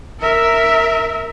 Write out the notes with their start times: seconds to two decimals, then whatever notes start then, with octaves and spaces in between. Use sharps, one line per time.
0.20 A#4 E5